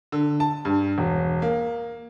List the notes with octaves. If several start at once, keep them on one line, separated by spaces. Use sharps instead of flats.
D3
A5
G2
E1
A#3